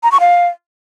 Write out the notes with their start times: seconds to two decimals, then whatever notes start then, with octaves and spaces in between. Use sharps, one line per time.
0.03 A#5
0.12 C#6
0.20 F5